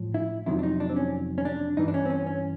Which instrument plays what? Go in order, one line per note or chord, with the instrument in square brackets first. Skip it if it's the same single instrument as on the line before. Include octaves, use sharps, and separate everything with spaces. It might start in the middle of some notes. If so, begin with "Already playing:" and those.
Already playing: [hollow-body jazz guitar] A2 F3
E4
F2 C3 D#3 F#3 E4
D4
D#4
D4
C4
C#4
C#4
D4
G2 E3 D#4
D4
C#4
C4
C#4
C#4